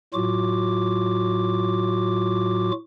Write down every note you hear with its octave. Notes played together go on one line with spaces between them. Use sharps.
A2 F#3 F4 F#4 D6